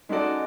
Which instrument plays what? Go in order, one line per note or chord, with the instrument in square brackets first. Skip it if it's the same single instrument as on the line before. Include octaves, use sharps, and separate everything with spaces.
[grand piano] G#3 C#4 F#4 A4 D5 [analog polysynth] D#4